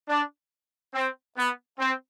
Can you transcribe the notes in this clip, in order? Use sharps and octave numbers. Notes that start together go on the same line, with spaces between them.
D4
C4
B3
C4